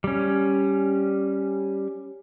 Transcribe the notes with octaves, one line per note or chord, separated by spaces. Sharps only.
G3 C#4